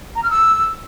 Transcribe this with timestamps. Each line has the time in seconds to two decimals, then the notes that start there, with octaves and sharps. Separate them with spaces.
0.15 A#5
0.23 F6
0.30 E6